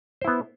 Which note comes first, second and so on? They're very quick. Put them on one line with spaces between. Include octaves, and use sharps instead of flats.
C5 E4 B3